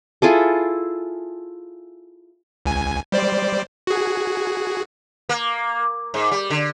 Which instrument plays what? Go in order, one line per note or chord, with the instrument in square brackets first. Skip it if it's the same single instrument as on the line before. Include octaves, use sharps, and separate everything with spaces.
[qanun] E4 F4 G#4 A4
[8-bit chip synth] C#2 G#5
G3 C5 D5
F#4 G#4
[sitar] A#3
G#2
G3
D3